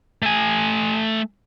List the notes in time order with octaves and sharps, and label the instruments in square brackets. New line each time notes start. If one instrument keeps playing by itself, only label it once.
[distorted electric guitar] A3 G#5